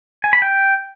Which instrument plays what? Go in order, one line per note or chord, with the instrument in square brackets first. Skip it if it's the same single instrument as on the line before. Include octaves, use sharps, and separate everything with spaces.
[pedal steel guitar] G#5
B5
G5